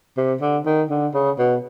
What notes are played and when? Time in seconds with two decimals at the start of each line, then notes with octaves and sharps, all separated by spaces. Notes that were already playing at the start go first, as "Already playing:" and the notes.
0.17 C3
0.41 D3
0.66 D#3
0.90 D3
1.14 C#3
1.38 B2